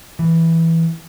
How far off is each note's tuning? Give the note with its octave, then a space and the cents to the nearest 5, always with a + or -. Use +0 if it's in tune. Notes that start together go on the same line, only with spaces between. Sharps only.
E3 -5